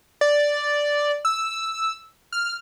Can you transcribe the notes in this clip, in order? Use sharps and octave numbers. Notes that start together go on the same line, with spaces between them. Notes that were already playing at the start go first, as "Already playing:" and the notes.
D5
E6
F6